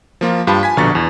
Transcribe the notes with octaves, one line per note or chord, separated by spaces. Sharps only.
F3 A#3 F4 A#4
G2 F4 G4 A5 B5
G#5 G#6 B6
A#1 B2 D3 A#5 C#6 A6
E2